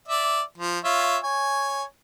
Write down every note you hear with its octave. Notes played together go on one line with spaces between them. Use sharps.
D5 E5
F3
F4 C#5 E5
C#5 G#5